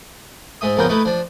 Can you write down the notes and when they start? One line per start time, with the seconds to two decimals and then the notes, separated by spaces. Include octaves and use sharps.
0.61 G#2 G#3 E5 D#6
0.77 A#1 F2 C#3 B3 A#4 G5
0.89 A3 D#4 E4 B4
1.05 F3 D4